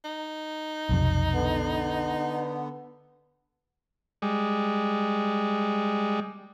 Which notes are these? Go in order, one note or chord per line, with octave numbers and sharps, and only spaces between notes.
D#4
B1 F2 C3
D3 B3
G3 G#3